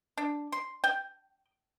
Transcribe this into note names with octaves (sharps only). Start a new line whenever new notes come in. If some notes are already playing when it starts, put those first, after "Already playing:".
D4
C6
G5